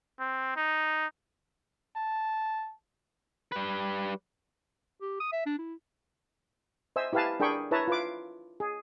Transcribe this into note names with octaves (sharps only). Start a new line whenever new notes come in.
C4
D#4
A5
G3 B4
G4
D#6
E5
D4
E4
C5 D#5 E5 G#5 E6
E4 G4 B4 F5 G#5 A5
D4 G#4 A#4 G5 B5 C#6
E4 B4 C#5 E5 A5 A#5
F4 B4 D6
G#4